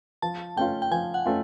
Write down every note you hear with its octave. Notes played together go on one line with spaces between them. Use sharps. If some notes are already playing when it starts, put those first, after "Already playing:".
F3 A5
A3 C#4 F4 G5
G5
F3 G#5
F#5
A3 C#4 F4